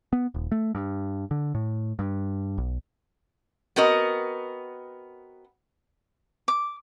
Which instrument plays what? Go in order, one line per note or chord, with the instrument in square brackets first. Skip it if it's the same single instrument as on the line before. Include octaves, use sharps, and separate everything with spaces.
[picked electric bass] B3
D#1
A3
G2
D3
A2
G2
B1
[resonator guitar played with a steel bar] B3 C4 F#4 A#4 D#5
[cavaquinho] D6